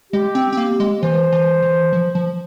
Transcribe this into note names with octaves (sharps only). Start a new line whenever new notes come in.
G#3 G4
C4
C4
A#3
G#3
E3 C5
E3
E3
F3
F3